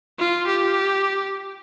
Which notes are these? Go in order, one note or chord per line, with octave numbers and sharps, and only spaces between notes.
F4
G4